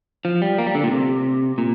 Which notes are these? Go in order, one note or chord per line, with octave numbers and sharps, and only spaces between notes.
F3
G3
A#3
G3
D3
A#2
C3
A#2